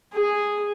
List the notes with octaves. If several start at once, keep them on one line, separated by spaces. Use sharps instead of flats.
G#4